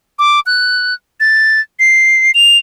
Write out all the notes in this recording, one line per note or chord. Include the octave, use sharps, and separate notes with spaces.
D6
F#6
A6
C7
F7